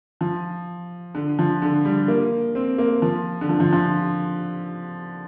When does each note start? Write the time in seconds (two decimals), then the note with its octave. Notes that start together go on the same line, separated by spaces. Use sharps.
0.21 F3
1.15 D3
1.39 F3
1.62 D3
1.85 G3
2.08 A#3
2.55 C4
2.78 A#3
3.02 F3
3.41 D3
3.49 F3
3.60 F3
3.73 F3